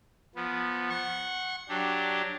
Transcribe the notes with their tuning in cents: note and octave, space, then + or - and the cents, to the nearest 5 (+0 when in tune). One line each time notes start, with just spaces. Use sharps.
F3 +0 B3 -10
F#5 +0 C#6 -35
F#3 +0 D4 +0 G4 +0